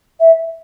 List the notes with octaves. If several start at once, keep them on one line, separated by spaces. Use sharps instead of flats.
E5